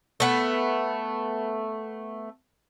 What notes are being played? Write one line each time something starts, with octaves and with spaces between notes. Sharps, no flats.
A3 B3